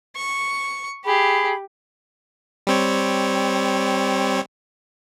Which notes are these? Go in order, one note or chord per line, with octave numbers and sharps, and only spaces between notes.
C#6
G4 G#4 B5
G3 C4 C#5